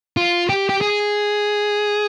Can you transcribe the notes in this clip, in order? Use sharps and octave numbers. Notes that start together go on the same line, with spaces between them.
F4
G4
G4
G#4